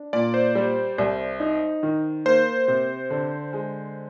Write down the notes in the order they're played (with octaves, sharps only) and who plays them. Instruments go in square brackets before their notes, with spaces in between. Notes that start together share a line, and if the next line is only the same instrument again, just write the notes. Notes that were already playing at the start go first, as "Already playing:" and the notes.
Already playing: [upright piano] D4
[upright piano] A#2 [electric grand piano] D5
[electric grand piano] C5
[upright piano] G3
C2
D#4
D#3
[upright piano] A#3 [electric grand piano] C5
[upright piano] C3
D3
G#3